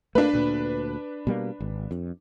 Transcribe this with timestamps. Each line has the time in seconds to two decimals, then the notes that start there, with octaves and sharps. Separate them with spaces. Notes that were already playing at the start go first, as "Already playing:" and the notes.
0.15 A3 A#3 D4 B4
0.34 D2 A#2
1.27 B2 G3 A#3
1.60 G#1
1.91 F2